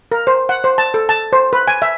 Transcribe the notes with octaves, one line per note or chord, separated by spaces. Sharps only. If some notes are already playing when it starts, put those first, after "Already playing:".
A#4
C5
F#5
C5
A5
A4
A5
C5
B4
G#5
E5